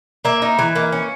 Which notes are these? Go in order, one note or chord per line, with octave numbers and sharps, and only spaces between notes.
A#3 E5
D#4
E3
A#3
C#4